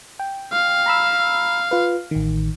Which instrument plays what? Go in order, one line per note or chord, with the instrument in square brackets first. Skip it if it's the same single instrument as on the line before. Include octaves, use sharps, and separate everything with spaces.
[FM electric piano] G5
[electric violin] F5
[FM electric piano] A#5 B5 E6
F4 B4
A1 D#3